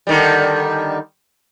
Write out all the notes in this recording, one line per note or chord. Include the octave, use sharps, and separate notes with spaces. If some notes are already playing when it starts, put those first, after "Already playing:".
D3 D#3 G3